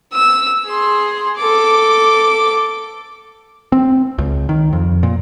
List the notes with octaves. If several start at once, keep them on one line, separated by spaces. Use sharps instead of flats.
E6
G#4 C6
A4 D6
C4
C#2
D#3
F2
A#2